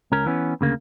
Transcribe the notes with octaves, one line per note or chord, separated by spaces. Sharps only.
C#2 C#4 A#4
E3 B3 C#4
D2 C#3 A#3